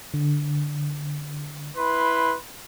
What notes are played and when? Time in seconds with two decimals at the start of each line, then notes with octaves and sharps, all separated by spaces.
0.14 D3
1.77 E4 B4 C6